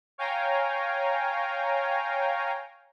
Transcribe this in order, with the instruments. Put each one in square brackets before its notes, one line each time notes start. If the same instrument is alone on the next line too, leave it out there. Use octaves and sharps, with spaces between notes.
[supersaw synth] C#5 F5 G5 G#5 A#5